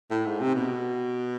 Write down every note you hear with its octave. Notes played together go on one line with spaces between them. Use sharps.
A2
G#2
C3
B2